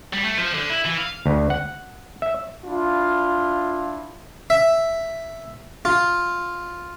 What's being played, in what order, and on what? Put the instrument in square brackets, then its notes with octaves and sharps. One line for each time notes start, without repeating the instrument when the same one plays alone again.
[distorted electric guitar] G3
A3
F3
D3
E4
E3
F5
[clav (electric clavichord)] D2
F#5
E5
[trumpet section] D4 E4 F4
[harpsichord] E5
F4